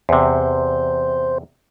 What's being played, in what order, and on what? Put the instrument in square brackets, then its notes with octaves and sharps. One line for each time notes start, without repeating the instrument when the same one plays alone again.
[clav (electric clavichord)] E2 C3 [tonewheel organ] C5